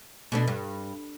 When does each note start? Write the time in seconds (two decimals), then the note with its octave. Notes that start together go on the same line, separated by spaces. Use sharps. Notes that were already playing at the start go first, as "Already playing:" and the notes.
0.32 B2 A3 D4
0.48 G2